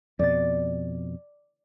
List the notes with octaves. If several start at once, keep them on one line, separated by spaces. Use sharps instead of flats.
F2 B2 D5 A6